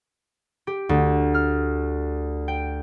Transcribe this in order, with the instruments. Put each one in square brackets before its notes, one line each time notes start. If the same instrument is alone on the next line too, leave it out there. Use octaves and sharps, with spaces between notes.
[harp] G4
D2
F6
G5